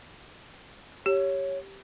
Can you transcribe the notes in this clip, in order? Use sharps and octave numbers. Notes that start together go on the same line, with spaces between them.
G4 C#5